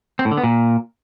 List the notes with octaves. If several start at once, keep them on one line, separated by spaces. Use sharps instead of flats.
C4
A2
D3
B3
A#2